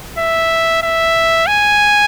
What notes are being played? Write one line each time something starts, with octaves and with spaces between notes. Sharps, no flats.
E5
E5
G#5